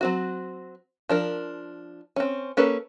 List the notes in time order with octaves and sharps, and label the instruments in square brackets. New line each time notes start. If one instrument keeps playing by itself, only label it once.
[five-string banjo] F#3 C4 F#4
F3 D4 A#4
C4 C#4
A#3 C#4 A4 B4